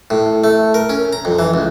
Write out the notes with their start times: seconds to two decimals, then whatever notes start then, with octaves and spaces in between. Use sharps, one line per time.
0.10 A2
0.44 A3
0.74 A#4
0.89 C#4
1.13 A#5
1.25 F2
1.39 E3
1.54 C#2